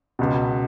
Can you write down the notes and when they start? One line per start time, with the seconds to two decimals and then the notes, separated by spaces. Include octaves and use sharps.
0.19 C#2 B2